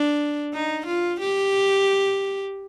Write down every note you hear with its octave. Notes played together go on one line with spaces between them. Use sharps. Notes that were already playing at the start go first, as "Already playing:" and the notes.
Already playing: D4
D#4
F4
G4